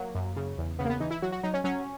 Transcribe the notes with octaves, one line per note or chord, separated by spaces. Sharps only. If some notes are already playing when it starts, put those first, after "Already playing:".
Already playing: F#3 A#3
F#2
C#3
E2
C#3 B3
A#3
B3
E3 D#4
E4
F#3 F#4
F#4
F#3 D#4
C#4
F#3 C#4